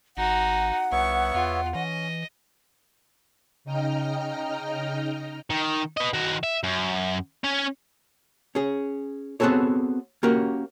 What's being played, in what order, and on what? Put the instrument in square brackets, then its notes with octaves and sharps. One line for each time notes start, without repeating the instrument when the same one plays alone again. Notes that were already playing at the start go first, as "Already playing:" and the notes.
[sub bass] G#1 [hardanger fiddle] D#4 F#4 [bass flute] F#5
[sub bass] C2 [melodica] B3 C#5 E5 [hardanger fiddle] C#6
[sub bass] E2 [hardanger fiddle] F4
[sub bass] E3 [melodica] C#4 [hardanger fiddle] D#5
[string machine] C#3 D#4 D#5 G5 A#5 F6
[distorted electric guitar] D#3
B4 D#5
D#3 F#4
E5
F#2
C#4 C#5
[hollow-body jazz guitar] C#4 G#4
B3 C4 F#4 G#4 A4 C#5
A#3 C#4 F#4 G4 A#4